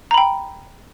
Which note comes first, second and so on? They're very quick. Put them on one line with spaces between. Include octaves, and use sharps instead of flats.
A#5 B5 G5